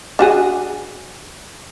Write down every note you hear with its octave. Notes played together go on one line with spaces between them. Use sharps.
D4 F#4 G#4